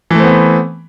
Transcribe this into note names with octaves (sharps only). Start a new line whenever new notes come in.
E3 A3 B3 C4